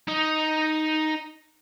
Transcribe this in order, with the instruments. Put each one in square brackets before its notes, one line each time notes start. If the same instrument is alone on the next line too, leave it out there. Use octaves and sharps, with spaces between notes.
[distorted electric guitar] D#4 D#5